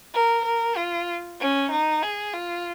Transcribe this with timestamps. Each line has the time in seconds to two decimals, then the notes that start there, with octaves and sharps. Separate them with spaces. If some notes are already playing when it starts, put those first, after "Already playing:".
0.14 A#4
0.45 A#4
0.77 F4
1.40 C#4
1.71 D#4
2.02 G#4
2.33 F4